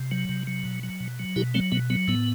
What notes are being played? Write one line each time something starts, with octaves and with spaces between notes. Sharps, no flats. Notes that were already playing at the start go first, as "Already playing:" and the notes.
Already playing: C3
F#3
C3
F#3
B2
F#3
B2
F#3
B2 E4 G4
F#3 A3 C4
B2 B3
F#3 B3
A2 B3